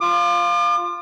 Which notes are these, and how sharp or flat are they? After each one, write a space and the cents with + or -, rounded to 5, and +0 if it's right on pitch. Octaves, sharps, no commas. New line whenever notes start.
F4 +0 D6 +40